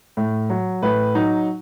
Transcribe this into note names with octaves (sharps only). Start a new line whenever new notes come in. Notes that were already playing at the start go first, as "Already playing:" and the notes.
A2
F#3
A2 B4
F#3 D#4